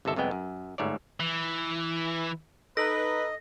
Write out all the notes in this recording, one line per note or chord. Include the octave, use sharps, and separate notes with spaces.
G1 C3 D#3 A4 E5
C2 F2 G#3 B3 G5
F#2
G1 G#2 A3 C#5 D5
E3
D#4 A4 B4 D#5 A#6